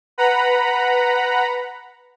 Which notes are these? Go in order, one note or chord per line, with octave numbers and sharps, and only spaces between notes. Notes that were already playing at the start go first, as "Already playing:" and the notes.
B4 F#5 A#5 B5